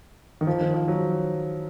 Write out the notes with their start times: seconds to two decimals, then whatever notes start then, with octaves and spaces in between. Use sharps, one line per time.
0.41 D#3
0.47 F3
0.61 D#3
0.74 F3
0.88 F#3